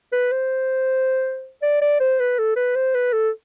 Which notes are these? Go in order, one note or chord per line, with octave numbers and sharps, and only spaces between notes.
B4
C5
D5
D5
C5
B4
A4
B4
C5
B4
A4